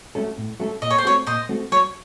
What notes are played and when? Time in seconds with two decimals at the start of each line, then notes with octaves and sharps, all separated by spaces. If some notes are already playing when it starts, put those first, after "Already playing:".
0.15 F#3 A3 C#4 A4
0.38 A2
0.60 F#3 A3 C#4 A4
0.82 A#2 D#5
0.90 C#5
0.98 C5
1.05 A3 C4 F#4 A4 C#5
1.26 A#2 C5 D#5
1.49 A3 C4 F#4 A4
1.72 F#3 C#5